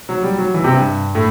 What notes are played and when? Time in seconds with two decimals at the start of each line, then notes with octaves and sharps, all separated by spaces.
0.09 F#3
0.23 G3
0.38 F#3
0.54 E3
0.64 C3
0.75 G2
1.15 A2